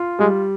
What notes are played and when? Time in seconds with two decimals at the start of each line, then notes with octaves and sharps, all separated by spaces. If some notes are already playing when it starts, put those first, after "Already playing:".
Already playing: F4
0.19 G3 G#3